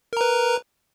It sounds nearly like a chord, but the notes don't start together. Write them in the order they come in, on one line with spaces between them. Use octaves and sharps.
A#4 A#5 B4